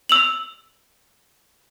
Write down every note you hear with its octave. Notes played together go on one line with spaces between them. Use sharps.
E6 F7 F#7